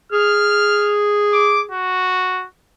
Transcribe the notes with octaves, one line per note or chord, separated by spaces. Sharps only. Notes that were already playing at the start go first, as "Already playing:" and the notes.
G#4 F6
D6
F#4